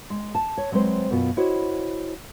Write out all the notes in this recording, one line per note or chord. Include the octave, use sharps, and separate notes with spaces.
G#3
A5
C#5
F#3 G#3 C4 B4 C5
F#2 B2 B3 F4
E4 F#4 C5 C#5 D#5